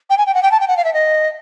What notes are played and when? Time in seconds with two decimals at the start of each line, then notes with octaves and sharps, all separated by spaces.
0.10 G5
0.18 G#5
0.26 G5
0.34 F#5
0.43 G5
0.51 A5
0.60 G5
0.68 F#5
0.77 F5
0.84 E5
0.93 D#5